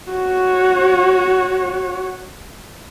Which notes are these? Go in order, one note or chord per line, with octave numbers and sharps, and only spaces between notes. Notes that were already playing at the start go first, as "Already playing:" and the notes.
F#4 C#5